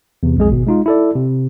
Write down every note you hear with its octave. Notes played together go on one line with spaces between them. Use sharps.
E2 C3
B1 F2 G#3 G#4
G#1 B2
G#3 D#4 F4
E4 A4 D5
C3